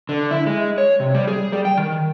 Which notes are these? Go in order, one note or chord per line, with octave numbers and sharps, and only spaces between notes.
D3
E4
G#3
C#5
C3
G3
G#4
G3
G5
D#3